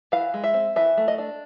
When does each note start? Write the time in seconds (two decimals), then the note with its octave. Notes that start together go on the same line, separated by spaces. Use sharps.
0.12 E3 F5
0.34 G#3
0.44 E5
0.54 C4
0.76 E3 E5
0.97 A3
1.08 D#5
1.18 D4